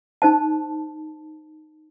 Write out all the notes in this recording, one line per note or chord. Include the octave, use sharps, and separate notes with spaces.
D#4 C5 A5